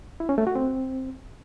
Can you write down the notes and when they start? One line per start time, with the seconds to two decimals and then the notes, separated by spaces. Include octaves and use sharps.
0.20 E4
0.29 C#4
0.38 A3
0.47 F#4
0.56 C4